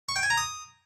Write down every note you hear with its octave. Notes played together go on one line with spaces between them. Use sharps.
C#6
G5
G#5
A#5
D#6